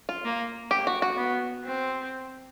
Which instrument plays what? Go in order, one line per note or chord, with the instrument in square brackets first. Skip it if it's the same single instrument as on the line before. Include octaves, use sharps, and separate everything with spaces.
[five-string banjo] F4
[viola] A#3
[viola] A#3 [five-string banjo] G4
[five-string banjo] F#4
F#4
[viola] B3
C4